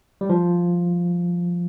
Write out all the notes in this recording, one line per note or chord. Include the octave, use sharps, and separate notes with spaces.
G3
F3